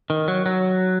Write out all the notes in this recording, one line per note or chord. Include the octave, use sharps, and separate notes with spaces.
D#3
F#3
F#3